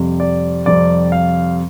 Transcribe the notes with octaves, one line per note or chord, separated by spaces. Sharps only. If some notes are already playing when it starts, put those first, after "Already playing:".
Already playing: F2 C3 G3
D5
F2 C3 G3 D5
F5